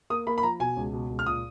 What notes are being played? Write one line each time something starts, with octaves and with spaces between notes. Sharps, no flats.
A#3 D#6
A#3 B5
B5
F3 A#5
B2 G#5
C#2
B2
C#2
F6
A#2 D#6